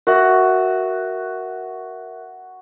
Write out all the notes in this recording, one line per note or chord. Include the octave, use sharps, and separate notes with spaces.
F#4 A#4 E5